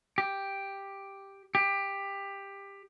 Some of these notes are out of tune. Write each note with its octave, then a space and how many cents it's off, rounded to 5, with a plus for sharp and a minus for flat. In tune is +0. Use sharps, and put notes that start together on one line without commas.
G4 +5
G4 +15